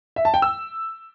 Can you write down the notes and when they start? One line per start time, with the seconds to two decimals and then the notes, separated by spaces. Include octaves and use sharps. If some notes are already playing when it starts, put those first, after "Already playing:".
0.16 E5
0.25 A5
0.34 G5
0.42 E6